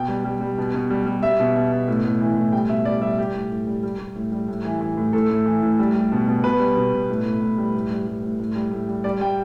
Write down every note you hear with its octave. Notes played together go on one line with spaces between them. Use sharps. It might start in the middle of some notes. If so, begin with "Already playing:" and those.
Already playing: B2 G5
G3
G3
G3
B2
B2
G3
G3
G3 E5
B2
B2
B2
A2
A2
E3
A2
G3 G5
B2 E5
G3 D5
G3 E5
G3 G4
A2
A2
G3
G3
G3
A2
G3
A2
E3
E3
A2
A2 A4
A2
E3
A2
G3
G3
B2
B2
B2 B4
G3
B2
B2
A2
A2
A2
G3
A2
G3
G3
A2
A2
G3
A2
G3
G3 D5
G3 G5